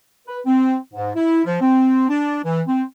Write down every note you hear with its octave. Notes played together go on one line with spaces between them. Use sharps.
B4
C4
G#2
E4
F3
C4
D4
E3
C4